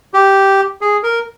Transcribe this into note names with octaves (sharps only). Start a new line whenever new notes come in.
G4
G#4
A#4